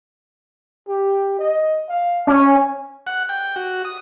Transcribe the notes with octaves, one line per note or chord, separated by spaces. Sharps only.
G4
D#5
F5
C#4 G#5
F#5
G5
F#4
D#6